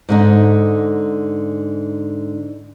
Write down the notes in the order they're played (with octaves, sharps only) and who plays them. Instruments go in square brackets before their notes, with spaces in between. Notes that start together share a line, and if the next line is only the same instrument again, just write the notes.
[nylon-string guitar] G#2 D3 D#4